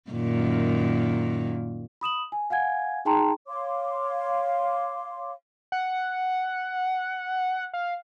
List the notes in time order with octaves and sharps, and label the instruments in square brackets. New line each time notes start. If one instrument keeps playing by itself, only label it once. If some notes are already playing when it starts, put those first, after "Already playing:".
[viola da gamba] F#2 A#2 D#3
[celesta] B5 D#6 E7 F#7
G#5
F5 F#5 G#5 G#6
D#4 G#4 G5 A5 A#5 C6
[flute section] C#5 F5 C6 D6
[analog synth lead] F#5
F5